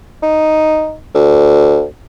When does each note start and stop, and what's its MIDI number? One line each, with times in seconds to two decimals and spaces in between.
0.22 0.95 63
1.14 1.84 38